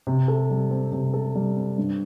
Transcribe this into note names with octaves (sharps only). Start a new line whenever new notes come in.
C3
A4
G3
C4
C3
A4
G3
C4
G2